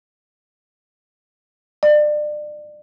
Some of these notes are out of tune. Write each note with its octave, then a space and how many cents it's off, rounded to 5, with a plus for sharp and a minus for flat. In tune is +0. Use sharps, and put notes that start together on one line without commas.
D5 +30